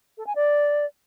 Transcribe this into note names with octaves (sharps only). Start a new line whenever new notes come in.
A4
G#5
D5